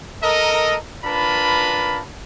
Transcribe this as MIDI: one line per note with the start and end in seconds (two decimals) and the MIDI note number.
0.23 0.77 69
0.23 0.77 70
0.23 0.77 75
1.05 2.02 62
1.05 2.02 65
1.05 2.02 70
1.05 2.02 71
1.05 2.02 81
1.05 2.02 83